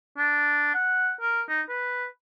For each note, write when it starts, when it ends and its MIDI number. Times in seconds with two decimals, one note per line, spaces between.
0.18 0.74 62
0.74 1.12 78
1.21 1.42 70
1.49 1.61 63
1.69 2.05 71